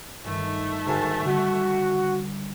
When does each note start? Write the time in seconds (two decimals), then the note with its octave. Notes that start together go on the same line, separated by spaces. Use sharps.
0.24 G1 D#3 A3
0.85 G#2 D3 D#3 F#4 A5
1.24 D3 G3 F#4 G#4